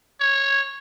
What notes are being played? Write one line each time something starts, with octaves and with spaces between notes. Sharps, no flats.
C#5